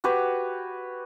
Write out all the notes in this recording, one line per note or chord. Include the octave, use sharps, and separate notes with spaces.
F#4 G4 B4 C#5